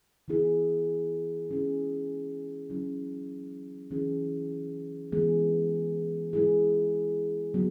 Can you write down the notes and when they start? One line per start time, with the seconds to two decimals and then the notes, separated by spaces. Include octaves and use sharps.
0.28 E3 B3 E4 G#4
1.50 G#3 C#4 E4 G#4
2.70 F#3 C#4 E4
3.91 E3 C#4 E4 G#4
5.12 E3 G#3 B3 G#4
6.33 G#3 E4 G#4
7.54 F#3 B3 F#4